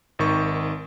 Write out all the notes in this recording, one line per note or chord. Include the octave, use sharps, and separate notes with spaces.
G#1 D#3 C#6